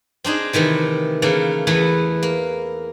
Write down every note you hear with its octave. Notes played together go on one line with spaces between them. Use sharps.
C4 D4 D#4 G#4
C3 D#3 E3 A3
C#3 E3 A3 A#3
E2 E3 A3 B3 E4
A#3